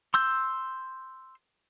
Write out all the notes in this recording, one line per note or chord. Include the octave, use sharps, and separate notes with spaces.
C6 E6 G6